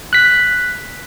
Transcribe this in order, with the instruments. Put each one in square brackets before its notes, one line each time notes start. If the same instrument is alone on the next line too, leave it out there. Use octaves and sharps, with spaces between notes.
[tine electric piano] F#6 B6